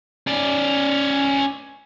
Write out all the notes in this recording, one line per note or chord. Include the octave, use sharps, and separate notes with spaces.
C#4 D5